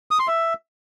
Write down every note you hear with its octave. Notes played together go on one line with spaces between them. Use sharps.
D#6
C6
E5